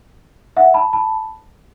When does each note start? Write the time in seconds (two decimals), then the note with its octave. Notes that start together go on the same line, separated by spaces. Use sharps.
0.57 E5 F#5
0.74 A5 B5
0.93 A5 B5